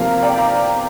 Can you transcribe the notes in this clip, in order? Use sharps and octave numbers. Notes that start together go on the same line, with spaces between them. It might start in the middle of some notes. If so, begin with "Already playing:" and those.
Already playing: C3 F3 A#3 F5 A#5
D5 G5
F5 A#5